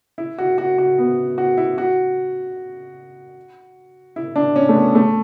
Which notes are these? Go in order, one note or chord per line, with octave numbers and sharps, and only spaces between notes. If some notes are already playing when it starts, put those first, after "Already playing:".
E4
F#4
F#4
F#4
B3
F#4
E4
F#4
E4
D4
C#4
A3
B3
A3